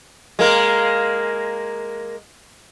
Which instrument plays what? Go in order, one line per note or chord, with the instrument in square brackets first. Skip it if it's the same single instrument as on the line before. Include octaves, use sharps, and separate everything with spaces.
[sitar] G#3 A#3 A#4